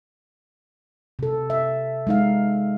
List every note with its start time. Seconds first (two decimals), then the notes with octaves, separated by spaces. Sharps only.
1.19 C3 A4
1.50 E5
2.07 G#3 D#4 F5